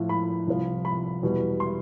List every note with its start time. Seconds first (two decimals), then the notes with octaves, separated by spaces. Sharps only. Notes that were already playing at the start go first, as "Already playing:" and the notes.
Already playing: A2 F3
0.09 B5
0.47 C2 C3 F3
0.85 B5
1.23 E2 B2 G3
1.60 C6